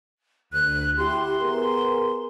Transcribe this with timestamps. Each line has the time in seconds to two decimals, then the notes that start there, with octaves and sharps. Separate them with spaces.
0.53 D2 F#6
0.98 E4 F#4 G4 C6
1.40 B3 G#4 A#4